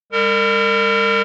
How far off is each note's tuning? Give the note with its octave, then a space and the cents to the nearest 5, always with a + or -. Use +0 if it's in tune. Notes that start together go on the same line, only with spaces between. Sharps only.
G3 +45 A#4 -35